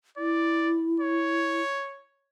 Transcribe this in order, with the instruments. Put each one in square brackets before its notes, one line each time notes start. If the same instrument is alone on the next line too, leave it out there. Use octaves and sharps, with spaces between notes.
[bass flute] E4 [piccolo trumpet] D5
[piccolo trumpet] C#5